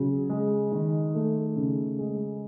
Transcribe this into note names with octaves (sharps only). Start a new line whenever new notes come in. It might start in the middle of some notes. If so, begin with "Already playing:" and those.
Already playing: C#3 F#3
G#3
D#3
A3
C#3
G#3